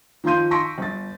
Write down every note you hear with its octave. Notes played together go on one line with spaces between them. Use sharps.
D#3 F3 F5 C6 G6 D#7
C6 C#6 E6 A#6 B6 D7
G1 A6